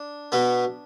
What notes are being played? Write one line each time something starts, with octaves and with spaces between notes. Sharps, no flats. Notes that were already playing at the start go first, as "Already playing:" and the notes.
Already playing: D4
B2 B3